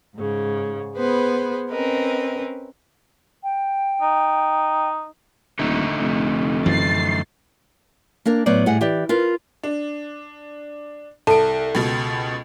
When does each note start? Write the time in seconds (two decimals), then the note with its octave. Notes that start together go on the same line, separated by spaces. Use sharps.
0.16 G#2 C#3
0.96 B3 G#4 B4 C5
1.70 C4 C#4 A#4 B4 D#5
3.44 G5
4.02 D#4
5.59 D#1 D3 A3 D#4
6.00 F1
6.66 F#2 E3 F3 A6 C7
8.26 A#3 D4 A#4
8.46 A2 F#3 B3 C5 D5
8.66 A2 G3 G#4 F#5
8.81 E3 G4 D5
9.09 F4 A#4 B4
9.63 D4
11.27 C2 A4 A5 D7
11.75 C#2 B2